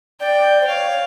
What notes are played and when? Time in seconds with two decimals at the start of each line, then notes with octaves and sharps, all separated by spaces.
0.20 D5 G5
0.61 C5
0.68 C#5 F5
0.91 C#5